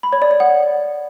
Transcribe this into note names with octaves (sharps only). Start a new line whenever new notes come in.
B5
C#5
D5
C#5
F#5